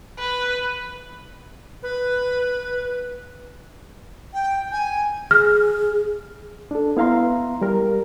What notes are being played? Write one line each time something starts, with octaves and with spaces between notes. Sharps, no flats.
B4
B4
G5
G#5
G#4 F6
D4 A4
B3 E4 F5 A#5 C6
G3 A#4